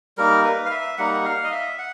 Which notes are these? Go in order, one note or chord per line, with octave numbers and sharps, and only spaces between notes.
G3 A#3 D#4 A#4
B4
F5
E5
G3 A#3 D#4 F#5
F5
D#5
E5
F#5